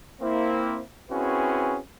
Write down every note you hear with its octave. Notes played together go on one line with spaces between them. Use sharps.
A#3 C4 E4
C4 C#4 E4 F#4 G#4 B4